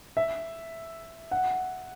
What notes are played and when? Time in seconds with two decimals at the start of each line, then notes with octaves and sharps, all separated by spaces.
0.17 E5
1.31 F#5